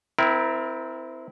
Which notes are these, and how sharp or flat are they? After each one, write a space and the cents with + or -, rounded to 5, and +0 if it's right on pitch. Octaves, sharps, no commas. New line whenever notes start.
C4 -25 E4 -5 A#4 +15